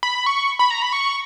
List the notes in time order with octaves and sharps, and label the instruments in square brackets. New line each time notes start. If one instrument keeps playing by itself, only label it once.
[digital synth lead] B5
C#6
B5
A#5
B5
C#6